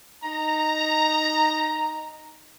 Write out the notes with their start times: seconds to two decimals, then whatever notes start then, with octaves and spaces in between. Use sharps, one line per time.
0.23 D#4 A#5